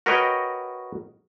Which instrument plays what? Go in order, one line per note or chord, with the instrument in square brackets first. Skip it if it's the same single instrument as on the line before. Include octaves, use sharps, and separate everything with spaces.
[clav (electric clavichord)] F#4 A#4 B4 C#5 D#5 G5